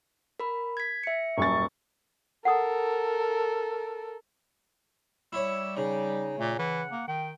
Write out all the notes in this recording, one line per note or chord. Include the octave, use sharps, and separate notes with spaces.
A#4 B5
G#6 B6
E5 C#7
D#1 F#2 C#6 A6
A4 A#4 F#5 D#6
G3 E4 C#5 E6
C#3 D#4
A#2 A3
E3 F#5
A#3
D#3 G5